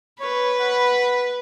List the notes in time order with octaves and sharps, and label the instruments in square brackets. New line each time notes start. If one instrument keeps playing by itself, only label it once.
[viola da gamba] B4 [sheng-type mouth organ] C#5
[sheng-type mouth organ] F#5 B5